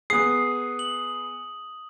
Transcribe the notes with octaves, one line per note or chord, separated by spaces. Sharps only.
B3 G#4 D#6 C7
F#7